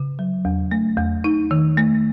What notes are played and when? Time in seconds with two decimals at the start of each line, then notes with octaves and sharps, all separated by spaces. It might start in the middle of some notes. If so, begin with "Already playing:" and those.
Already playing: C#3
0.19 F#3
0.45 E2
0.71 A3
0.98 E2
1.24 D#4
1.51 D#3
1.77 A3